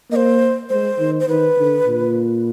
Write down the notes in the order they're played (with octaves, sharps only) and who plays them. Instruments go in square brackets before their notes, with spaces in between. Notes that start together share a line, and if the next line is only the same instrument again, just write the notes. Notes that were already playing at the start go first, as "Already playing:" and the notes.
[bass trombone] A#3 [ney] D#5
[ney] C5
[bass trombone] G#3 [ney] C5
[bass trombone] D#3
[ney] C5
[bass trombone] D#3 [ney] B4
[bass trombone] D3
A#2